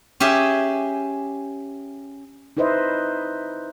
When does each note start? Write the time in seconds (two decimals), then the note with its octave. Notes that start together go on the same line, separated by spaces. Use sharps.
0.20 C#4 G4 G#4 E5 G#5
2.57 D#4 E4 B4 C5 D#5 E5